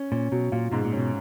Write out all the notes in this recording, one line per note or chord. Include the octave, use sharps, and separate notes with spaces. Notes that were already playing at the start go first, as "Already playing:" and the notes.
Already playing: C#4
A#2 C#4
B2 F#3
A#2 F4
G#2 B2
A#2
B2 C#4